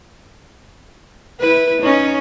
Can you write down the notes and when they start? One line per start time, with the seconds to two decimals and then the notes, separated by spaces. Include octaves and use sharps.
1.40 E4 B4
1.81 C#4 D#4